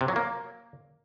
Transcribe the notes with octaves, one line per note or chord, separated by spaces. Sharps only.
C3
F#3
A#3